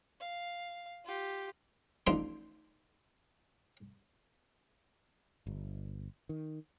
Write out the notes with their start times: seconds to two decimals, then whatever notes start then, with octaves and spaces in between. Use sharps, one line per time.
0.20 F5
1.05 F4 G4
2.07 A1 F3 D4 D#4 E5 C6
5.47 G1
6.29 D#3